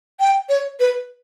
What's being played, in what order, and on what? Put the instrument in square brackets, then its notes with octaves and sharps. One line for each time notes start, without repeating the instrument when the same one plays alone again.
[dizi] G5
C#5
B4